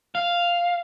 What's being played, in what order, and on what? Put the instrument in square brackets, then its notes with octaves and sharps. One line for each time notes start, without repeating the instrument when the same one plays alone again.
[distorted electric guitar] F5